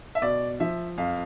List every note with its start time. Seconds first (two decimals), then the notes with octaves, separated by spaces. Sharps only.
0.15 E5
0.22 B2 D5
0.60 F3 E5
0.98 F2 F5